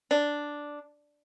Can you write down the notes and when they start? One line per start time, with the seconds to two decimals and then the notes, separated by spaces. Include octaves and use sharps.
0.11 D4